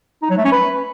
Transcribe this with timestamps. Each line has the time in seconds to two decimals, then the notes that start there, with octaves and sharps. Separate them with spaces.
0.22 D#4
0.30 F#3
0.37 A3
0.45 C#4
0.52 B4